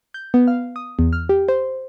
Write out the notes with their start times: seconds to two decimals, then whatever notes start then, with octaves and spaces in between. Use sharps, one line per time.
0.14 G6
0.34 B3
0.48 F5
0.76 D#6
0.99 E2
1.13 F6
1.29 G4
1.49 C5